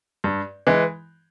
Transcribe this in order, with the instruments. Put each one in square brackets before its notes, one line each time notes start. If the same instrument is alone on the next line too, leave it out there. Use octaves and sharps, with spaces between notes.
[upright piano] G2
E3 G#3